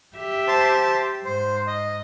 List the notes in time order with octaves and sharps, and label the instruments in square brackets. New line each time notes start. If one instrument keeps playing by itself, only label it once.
[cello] G4 E5
[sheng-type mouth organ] C5 A5
[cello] G#2 [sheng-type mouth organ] C5
[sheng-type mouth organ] D#5